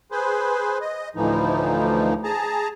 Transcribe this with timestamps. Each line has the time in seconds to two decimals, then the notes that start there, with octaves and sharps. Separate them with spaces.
0.12 G#4 B4 C5
0.81 D#5
1.16 D2 A2 E3 F3 D#4
2.24 G#4 A5 A#5